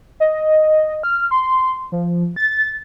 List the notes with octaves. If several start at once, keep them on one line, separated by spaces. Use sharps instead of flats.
D#5
F6
C6
F3
A6